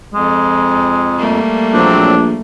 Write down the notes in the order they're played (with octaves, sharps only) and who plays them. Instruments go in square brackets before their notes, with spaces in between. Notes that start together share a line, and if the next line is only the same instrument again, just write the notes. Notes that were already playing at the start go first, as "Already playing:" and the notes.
[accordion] F2 [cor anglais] G#3
[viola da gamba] G3 A3 A#3
[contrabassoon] A#1 [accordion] F#3 C4 [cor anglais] D4